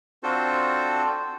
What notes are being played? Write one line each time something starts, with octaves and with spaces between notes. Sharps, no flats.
C4 D4 F4 F#4 A4 C5